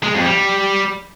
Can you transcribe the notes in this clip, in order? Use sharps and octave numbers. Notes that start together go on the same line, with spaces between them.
G#3
F2
G3